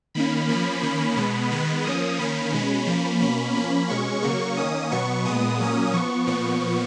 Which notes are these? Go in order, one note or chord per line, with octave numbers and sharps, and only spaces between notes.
D#3 A#3 C#4 B5
F3 A#3 C#4 B5
D#3 A#3 C#4 B5
B2 G#3 B3
D#3 G#3 B3 B5
F3 A#3 C#4 D#6
D#3 A#3 C#4 B5
B2 G#3 C#4
F3 A#3 C#4
B2 A#3 C#4 B5
F3 A#3 C#4 B5
B2 G#3 C#4 C#6
C#3 F#3 A#3 C#6
D#3 A#3 C#4 D#6
B2 F#3 B3 C#6
A#2 G#3 B3 D#6
A#2 F#3 A#3 C#4
F3 B3 C#6
A#2 F3 B3 C#6